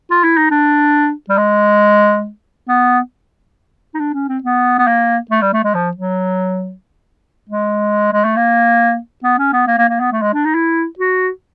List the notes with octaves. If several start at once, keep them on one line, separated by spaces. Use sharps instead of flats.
F4
E4
D#4
D4
G3
G#3
B3
D#4
D4
C#4
C4
B3
B3
A#3
A3
G3
A3
G#3
F3
F#3
G#3
G#3
A3
A#3
B3
C#4
B3
A#3
A#3
A#3
B3
A3
G#3
D4
D#4
E4
F#4